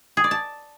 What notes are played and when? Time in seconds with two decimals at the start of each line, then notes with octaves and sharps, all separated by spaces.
0.17 G#4
0.24 D5
0.31 A5